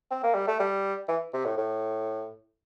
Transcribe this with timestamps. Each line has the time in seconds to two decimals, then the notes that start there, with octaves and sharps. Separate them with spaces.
0.11 C4
0.23 A#3
0.34 G3
0.47 A3
0.60 G3
1.08 E3
1.33 C3
1.45 A2
1.57 A2